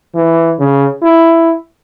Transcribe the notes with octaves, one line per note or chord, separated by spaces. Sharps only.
E3
C#3
E4